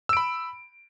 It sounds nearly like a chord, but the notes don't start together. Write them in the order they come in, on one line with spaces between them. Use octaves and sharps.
E6 D7 B5